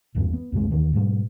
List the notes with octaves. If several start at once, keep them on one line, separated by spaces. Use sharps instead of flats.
G#1 E2 G2 E3
B3
C2 F#2 C3 G#3
D#2 D#3 E3
G#2 B2 G3